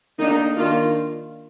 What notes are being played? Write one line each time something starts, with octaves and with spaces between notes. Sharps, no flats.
D#3 A#3 D4 D#4
D#3 A#3 D4 F4